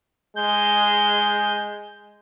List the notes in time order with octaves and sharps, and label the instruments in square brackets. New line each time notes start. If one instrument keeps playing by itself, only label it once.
[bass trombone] G#3 [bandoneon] G6